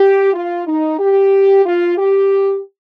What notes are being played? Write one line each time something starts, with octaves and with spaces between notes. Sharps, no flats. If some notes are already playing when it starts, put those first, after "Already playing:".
Already playing: G4
F4
D#4
G4
F4
G4